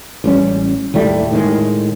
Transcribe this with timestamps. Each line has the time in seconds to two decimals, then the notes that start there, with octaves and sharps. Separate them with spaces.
0.24 A1 G3 C#4
0.94 D#2 A2 G3 A3
1.31 A2 D#3 G#3